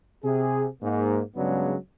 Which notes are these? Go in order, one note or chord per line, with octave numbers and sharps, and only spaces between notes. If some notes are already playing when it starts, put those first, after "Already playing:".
C3 G#4
G#2 A#3
G2 C#3 F#3 G#3 B3 D4